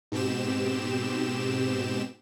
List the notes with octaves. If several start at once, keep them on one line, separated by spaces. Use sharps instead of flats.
G#2 B2 C4 G4 E7